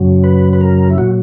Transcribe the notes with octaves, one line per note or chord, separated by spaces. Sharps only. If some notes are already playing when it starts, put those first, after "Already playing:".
Already playing: F#2 C#3 F#3
B4
B4
A#4
E4
A#2 F#3 F#4